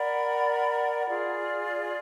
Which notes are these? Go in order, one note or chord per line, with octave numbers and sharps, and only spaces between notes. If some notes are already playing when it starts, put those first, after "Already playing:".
Already playing: A#4 D5 F#5 B5
F4 G#4 D5